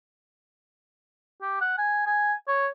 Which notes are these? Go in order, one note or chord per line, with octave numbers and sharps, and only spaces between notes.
G4
F#5
G#5
G#5
C#5